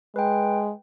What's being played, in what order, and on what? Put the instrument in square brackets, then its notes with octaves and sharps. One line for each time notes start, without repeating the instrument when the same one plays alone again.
[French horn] G#3 [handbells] B4 G5